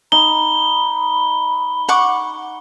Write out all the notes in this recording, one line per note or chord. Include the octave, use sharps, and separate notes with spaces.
D#4 B5 G7
F#5 C#6 D6